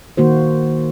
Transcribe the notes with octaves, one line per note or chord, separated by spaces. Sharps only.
D#3 A#3 F#4 C5